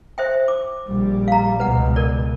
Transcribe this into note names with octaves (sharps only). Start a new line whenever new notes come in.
C5 E5 G5
D6
A#1 G3
F5 A#5
C#2 B2 B4 F#5
A#4 D5